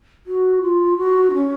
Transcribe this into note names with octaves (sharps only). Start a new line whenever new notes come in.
F#4
F4
F#4
D#4
C#4